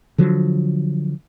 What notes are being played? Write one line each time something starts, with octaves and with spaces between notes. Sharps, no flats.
D3 F3 F#3